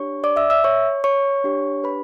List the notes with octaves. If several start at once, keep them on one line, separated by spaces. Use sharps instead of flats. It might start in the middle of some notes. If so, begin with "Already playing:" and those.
Already playing: D4 G4 C#5 C#6
D5 D6
E5 E6
E5 E6
C#5 C#6
C#5 C#6
D4 G4
B4 B5